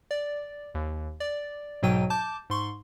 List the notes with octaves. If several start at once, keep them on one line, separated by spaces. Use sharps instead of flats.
D5
D#2
D5
B1 G#2 B2 F#3 G5 D#7
A5 D6 G6
G#2 C6 C#6